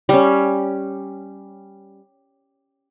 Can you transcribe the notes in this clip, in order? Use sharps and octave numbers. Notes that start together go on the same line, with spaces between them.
G3 C#4